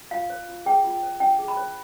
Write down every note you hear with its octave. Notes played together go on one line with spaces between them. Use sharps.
F4 F5
C5
F4
G#4 G5
F4
C5
D4 G5
G#4
B5
C5